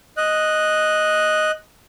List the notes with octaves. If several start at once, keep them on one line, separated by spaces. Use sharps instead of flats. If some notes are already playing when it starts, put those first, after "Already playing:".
D#5 F#6